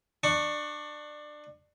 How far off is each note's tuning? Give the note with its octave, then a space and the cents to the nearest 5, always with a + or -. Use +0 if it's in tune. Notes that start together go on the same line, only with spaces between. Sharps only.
D4 +25 C#6 +0